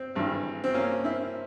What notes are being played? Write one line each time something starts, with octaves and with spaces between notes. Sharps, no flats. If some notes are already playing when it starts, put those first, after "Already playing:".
Already playing: C4
G#1 G2 E3
C4
A#3 C#4
C4 E4